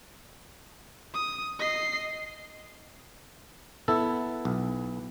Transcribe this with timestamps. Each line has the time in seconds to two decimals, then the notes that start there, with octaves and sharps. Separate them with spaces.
1.14 D#6
1.60 D#5 C7
3.88 B3 E4 A4
4.45 B1